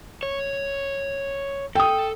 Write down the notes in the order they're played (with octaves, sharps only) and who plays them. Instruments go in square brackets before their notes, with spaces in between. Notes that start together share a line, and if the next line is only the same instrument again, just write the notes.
[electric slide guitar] C#5
[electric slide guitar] A4 [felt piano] G5 D#6